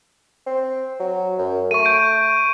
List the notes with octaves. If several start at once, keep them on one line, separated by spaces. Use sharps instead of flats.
C4
F#3
F#2
A3 C#6 D#7
C#6 G6 D7